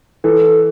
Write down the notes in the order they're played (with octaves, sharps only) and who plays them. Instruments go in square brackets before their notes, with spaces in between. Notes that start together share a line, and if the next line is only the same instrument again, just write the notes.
[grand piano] E3 [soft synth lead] A4